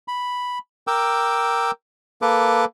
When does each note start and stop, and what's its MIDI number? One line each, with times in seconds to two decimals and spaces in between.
0.08 0.58 83
0.87 1.71 70
0.87 1.71 79
0.87 1.71 86
0.87 1.71 88
2.22 2.65 58
2.22 2.65 69
2.22 2.65 71
2.22 2.65 86